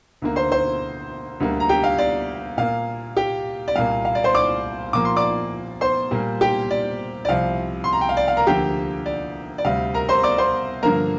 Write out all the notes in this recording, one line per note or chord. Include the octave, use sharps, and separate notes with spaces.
D2 D3 A#3
C5 C6
C5 C6
D2 D3 G3 A#3
A#5
G4 G5
F5
D5
A#2 A#3 F5
G4 G5
D5
C2 A#2 A#3 F5
F5
D5
C5 C6
D5 D6
A#2 F3 A#3 D6
C6
D5 D6
C5 C6
A#2 G3 A#3
G4 G5
D5
D5
C2 C3 F3 F5
C6
A#5
G5
F5
D5
F5
A#4 A#5
D2 D3 F3 A#3 G4 G5
D5
D5
D2 C3 G3 F5
A#4 A#5
C5 C6
D5 D6
C5 C6
G2 D3 F3 A#3 A#4 A#5